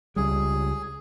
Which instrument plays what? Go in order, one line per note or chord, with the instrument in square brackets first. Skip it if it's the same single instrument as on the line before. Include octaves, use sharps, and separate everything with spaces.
[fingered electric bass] C#2 G3 [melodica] G#4